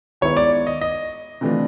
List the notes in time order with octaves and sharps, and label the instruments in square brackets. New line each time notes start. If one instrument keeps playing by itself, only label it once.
[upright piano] D#3 G#3 B3 E4 [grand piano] C#5
[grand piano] D5
D#5
D#5
[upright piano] C3 E3 A3 D4 F4